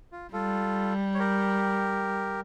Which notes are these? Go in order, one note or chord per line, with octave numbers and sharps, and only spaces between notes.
F4
G3 F4 A4
C#5
G4 A#4